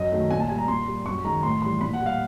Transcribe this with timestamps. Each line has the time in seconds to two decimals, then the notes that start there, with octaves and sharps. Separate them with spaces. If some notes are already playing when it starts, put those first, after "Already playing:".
Already playing: F#2 D#5
0.12 D#3 F#3 A3
0.30 A#2 G#5
0.40 A5
0.49 G3 G#5
0.58 A#5
0.68 A#2 C6
0.87 G3
1.06 F#2 C#6
1.24 D#3 G#3 A#5
1.43 A2 C6
1.62 E3 G3 C6
1.81 A#2 B5
1.93 F#5
2.00 G3
2.06 F5